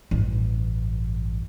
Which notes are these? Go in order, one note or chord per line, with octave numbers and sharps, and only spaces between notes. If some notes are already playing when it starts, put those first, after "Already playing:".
A1 G2